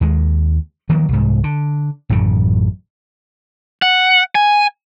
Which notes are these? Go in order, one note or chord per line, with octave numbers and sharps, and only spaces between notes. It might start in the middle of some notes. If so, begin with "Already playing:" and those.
D#2 G#3
D#3 F3 F#3 A#3
C2 G#2
D3
A1 F#2 A2 C#3
F#5
G#5